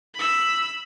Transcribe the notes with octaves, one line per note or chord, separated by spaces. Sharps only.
B5 E6